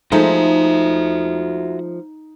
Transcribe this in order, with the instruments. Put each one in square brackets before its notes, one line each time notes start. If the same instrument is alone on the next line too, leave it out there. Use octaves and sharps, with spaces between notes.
[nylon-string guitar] F3 G#3 A3 [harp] D#4 [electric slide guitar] F#4 E5